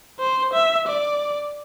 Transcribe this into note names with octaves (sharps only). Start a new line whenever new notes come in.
C5
E5
D5